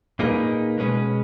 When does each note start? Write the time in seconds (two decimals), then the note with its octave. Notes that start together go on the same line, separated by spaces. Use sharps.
0.19 A#2 A#3 D#4 G#4 B4
0.78 B2 G#3 C#4 G#4 B4